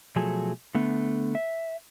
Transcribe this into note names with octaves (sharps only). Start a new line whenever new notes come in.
B2 F3 F#3 A3 G#4 A4
D3 A3 B3
E5